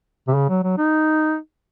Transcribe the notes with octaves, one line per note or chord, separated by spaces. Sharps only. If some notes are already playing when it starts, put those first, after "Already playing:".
C3
C#3
F#3
F#3
D#4